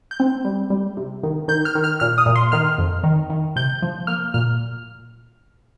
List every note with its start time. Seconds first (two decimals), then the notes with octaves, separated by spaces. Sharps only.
0.11 G6
0.20 C4
0.45 G3
0.70 G3
0.97 C3
1.23 D#3
1.48 D#3 G6
1.65 F6
1.75 D#3
1.84 F6
2.00 A#2 F6
2.18 D#6
2.26 A#2
2.36 C6
2.52 D#3 F6
2.78 F2
3.04 D#3
3.30 D#3
3.56 C3 G6
3.82 F3
4.07 A#3 F6
4.34 A#2 F6